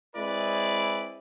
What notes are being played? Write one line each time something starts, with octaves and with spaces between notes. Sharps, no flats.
G#3 C4 E4 B4 D5